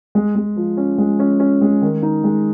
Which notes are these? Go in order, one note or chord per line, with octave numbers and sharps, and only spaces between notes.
G#3
G#3
F3
C#4
G#3
C#4
C#4
G#3
D#3
D#4
G#3